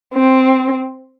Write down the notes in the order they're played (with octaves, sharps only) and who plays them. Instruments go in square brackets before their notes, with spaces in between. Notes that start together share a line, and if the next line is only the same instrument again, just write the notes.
[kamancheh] C4